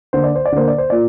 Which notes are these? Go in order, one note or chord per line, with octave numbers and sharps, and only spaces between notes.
D3 A#3 C5
D5
C5
D5
D3 A#3 C5
D5
C5
A#2 D5